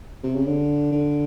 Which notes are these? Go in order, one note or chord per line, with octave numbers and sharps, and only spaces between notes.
C3
C#3
D3
D3